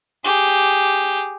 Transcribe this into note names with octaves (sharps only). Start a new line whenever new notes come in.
G4 G#4